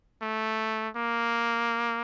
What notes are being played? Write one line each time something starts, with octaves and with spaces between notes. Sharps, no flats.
A3
A#3